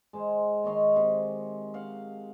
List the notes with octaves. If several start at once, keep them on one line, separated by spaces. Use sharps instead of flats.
G#3 C5
D#3 C#5 D#5 C6
C3
F5 F#5